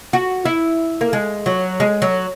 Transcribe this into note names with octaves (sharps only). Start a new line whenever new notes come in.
F#4
E4
A#3
G#3
F#3
G#3
F#3